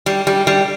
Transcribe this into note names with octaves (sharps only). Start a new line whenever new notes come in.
G3
G3
G3